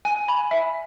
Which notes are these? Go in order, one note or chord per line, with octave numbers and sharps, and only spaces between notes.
G#5
B5
E5